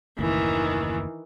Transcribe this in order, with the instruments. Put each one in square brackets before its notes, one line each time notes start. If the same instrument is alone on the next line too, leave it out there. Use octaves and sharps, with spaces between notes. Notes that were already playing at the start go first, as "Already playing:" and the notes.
[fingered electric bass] F#1 D#2 A2 [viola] D#3 E3